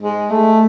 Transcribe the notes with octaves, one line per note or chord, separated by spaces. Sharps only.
G#3
A3